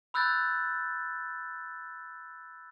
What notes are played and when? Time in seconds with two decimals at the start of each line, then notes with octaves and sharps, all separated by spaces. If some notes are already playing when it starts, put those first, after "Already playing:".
0.14 B5 E6 F#6 G6 A6